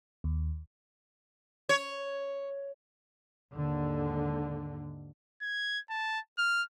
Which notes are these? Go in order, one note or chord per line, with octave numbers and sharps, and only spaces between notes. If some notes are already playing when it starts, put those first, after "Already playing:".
D#2
C#5
D#2 G#2 D3
G#6
A5
F6